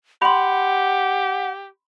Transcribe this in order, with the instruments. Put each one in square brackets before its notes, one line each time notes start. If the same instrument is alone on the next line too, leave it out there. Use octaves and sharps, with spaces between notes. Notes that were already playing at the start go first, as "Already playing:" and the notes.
[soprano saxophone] G4 [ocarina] F#5 [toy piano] B5 C6